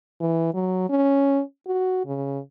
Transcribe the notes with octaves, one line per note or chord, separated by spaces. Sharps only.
E3
F#3
C#4
F#4
C#3